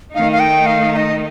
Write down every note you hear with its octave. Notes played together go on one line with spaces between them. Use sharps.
D#3 A3 D#4 F5
F5
G5
F5
F5
D#5